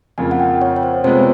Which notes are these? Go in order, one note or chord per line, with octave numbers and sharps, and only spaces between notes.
F2 C#3 F3 A#3 G#5
F#5
G5
C#5
C#5
C5
C3 F3 G#3 B3 C5